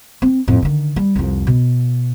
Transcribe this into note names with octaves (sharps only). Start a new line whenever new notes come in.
C4
F2 A2
D3 D#3
G3
C2 F2
B2